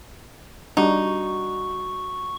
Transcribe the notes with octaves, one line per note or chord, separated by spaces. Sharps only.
G3 D4 D#4 F#4 C#6